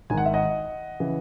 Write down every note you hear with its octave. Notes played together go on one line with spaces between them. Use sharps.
G#1 G#2 D#3 G#5
F#5
E5
D#5 F#5
C#3 E3